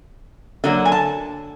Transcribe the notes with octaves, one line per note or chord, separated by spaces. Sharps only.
D3 F#3 A#3 D#5
G#5
A5